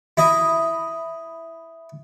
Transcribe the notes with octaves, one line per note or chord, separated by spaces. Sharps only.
E4 D#5